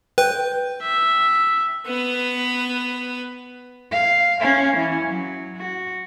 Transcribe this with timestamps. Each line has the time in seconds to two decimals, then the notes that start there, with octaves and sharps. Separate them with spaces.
0.18 B4 G5
0.82 E5
1.86 B3 B4
3.91 F5
4.40 C#4 F5
4.76 E3 C#4
5.06 F#3
5.57 F#4